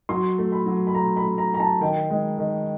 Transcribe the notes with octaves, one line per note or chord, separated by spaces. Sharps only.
F#3 C6
A3
B5
F#3
B5
A3 A#5
B5
A3
A#5
F#3 A#5
A5
D#3 G5
G#3
D#3